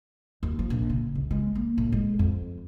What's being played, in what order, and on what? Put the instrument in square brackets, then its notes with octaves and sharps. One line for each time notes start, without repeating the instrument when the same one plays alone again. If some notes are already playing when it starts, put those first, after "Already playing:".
[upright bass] D#2
F3
A#1
C#3
C#2
G#3
A#3
A2
G#3
F2